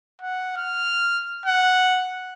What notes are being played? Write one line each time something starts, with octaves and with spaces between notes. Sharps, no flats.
F#5
F6
F#5